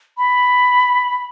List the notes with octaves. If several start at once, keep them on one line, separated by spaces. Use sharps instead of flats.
B5